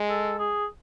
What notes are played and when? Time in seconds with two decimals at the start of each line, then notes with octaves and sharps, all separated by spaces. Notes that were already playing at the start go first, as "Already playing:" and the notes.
Already playing: G#3
0.09 A4
0.39 G#4